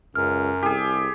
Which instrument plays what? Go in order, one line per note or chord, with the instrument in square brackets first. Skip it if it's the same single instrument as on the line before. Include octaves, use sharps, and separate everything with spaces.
[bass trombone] C#2 [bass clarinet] F#2 [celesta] F6
[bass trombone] C2 [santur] G4 G#4